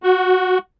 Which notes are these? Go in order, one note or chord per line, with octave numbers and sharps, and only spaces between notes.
F#4